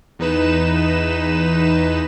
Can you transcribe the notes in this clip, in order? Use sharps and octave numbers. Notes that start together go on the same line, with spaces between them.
E2 D#4 B4 E7